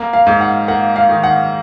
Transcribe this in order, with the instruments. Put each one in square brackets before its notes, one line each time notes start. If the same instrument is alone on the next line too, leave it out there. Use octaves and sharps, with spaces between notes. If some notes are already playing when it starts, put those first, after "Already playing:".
Already playing: [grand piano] A#3
[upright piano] F5
[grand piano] G#2
[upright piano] F#5
[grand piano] A#3 [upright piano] F#5
[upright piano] F5
[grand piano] D#3
[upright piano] F#5